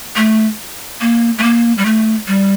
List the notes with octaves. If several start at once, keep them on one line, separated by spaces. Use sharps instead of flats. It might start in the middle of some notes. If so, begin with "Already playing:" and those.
A3
A#3
A3
A#3
G3
A3
G3